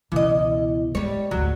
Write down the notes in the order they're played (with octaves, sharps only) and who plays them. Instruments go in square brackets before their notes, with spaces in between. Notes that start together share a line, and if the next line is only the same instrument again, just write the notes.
[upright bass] C#2 B2 [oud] E3 D#5
[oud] G3 C#5 [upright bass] G#3
[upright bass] G#1 D2 [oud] F#3